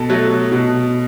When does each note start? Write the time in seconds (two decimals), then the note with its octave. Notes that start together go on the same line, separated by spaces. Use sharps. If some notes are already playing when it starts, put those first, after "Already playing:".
Already playing: B2 A4
0.10 F#3 A3
0.52 B2